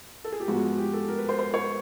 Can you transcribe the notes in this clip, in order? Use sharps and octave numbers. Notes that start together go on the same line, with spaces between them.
A4
G#4
G4
G#2 F3 G#3 B3 F#4
G4
A4
A#4
B4
C5
C5
C#5